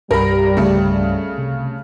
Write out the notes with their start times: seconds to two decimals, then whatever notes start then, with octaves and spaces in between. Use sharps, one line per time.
0.11 C2 G2 G3 A#4 B5
0.57 C#3 A3
1.38 C3